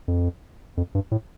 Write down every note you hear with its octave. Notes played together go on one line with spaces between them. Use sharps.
F2
F2
G2
A2